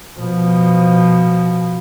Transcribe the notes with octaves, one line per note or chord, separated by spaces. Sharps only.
B2 F3